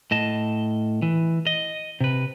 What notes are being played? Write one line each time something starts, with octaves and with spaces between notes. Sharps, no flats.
A2 D#5 A5
E3
D#5
C3 B4